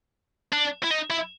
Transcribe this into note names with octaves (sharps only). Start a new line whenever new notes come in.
D4
E4
D#4
E4